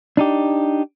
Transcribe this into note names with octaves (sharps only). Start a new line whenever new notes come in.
D4 D#4 G4